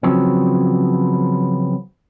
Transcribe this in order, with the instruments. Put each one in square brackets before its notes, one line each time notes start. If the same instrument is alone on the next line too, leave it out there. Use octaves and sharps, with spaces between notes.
[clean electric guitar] C#3 F3 F#3 B3 C4